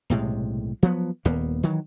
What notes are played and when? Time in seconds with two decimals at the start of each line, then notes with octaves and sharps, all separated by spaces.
0.10 B1 A2 C3 G#3
0.83 F3 F#3 B3
1.25 D#1 D#2 A#3 B3
1.63 D#3 E3 F#3